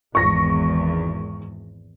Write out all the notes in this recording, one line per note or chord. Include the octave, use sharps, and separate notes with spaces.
G#1 E2 C#6 A#6